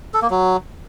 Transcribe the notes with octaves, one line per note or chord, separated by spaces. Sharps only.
A4
A#3
F#3